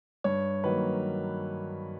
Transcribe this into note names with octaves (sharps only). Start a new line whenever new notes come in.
G2 C#5
D#3 F#3 A#3 B4